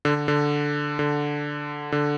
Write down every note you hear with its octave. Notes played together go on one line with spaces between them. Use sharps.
D3
D3
D3
D3